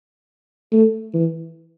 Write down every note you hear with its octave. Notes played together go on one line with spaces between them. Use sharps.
A3
E3